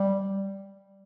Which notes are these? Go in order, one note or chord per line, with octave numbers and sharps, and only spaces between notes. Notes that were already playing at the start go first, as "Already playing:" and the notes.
Already playing: G3